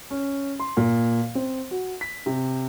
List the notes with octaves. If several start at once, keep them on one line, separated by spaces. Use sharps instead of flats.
C#4
C6
A#2
C4
F#4
B6
C3